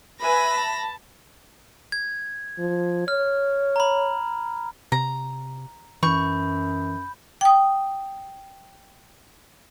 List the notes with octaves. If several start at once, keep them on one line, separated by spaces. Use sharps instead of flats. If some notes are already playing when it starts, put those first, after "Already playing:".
B4 E5 G#5 B5 A#6
A5
G#6
F3
C#5 F6
A#5 B5
C3 A#5
F#2 E3 B5 C#6 G6
G5 D#6